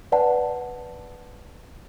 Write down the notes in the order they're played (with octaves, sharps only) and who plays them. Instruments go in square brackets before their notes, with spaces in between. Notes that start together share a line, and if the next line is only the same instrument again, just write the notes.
[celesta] B4 D5 F#5 A5